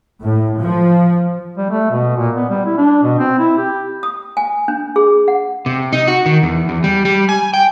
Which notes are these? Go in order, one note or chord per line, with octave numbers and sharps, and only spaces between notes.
A2
F3
G3
A3
B2
A#2
B3
G3
E4
D4
B2
C4
E4
G4
D#6
G#5
D4
G#4
F#5
C3
D#4
F#4
D#3
E2
E2
G3
G3
G#5
G5